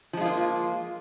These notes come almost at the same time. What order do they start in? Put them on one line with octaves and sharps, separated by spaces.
F3 G#3 F4 A#3